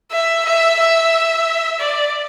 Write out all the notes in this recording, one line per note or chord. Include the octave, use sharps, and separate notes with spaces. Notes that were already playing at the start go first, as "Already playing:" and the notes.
E5
E5
E5
D5